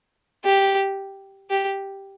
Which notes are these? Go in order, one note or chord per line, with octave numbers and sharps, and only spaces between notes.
G4
G4